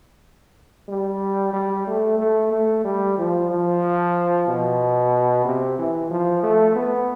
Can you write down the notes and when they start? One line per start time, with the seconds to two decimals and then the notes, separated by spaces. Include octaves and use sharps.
0.88 G3
1.53 G3
1.87 A3
2.19 A3
2.52 A3
2.84 G3
3.18 F3
3.50 F3
4.48 B2
5.45 C3
5.78 E3
6.10 F3
6.43 A3
6.76 B3